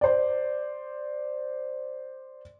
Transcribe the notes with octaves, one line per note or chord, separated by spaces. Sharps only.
C5 D5